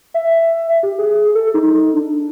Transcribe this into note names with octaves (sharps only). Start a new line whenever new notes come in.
E5
G4
G#4
A4
D#4
D4